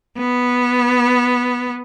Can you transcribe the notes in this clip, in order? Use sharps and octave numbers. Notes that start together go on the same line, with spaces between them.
B3